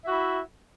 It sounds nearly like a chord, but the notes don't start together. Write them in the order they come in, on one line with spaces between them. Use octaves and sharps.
E5 F#4 E4